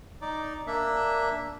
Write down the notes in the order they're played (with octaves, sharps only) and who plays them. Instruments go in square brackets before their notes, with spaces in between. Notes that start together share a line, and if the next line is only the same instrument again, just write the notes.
[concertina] D#4 D5
A#3 D4 E5